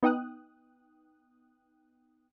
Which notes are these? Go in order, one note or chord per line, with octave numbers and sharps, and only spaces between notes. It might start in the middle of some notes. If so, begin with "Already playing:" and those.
B3 D#4 G5 D#6 F#6